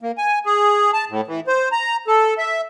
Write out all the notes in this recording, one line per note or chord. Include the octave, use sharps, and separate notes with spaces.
A#3
G#5
G#4
A5
A2
E3
C5
A#5
A4
E5